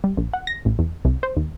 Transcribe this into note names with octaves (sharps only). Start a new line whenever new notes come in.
G3
A#1
F#5
A#6
A1
E2
C2
C5
D#2